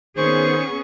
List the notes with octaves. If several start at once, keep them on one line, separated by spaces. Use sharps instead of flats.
D#3 B3 C#4 G#4 C5 C#6